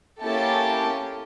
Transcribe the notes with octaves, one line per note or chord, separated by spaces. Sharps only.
A#3 C#4 E4 G4 A4 A5